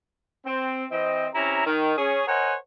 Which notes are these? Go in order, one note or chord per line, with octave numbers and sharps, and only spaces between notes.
C4
E3 C4 D#5
C3 C#4 E4 A#5
D#3
C#4 G#4 C#5
A#4 C5 C#5 D#5 F#5 G#5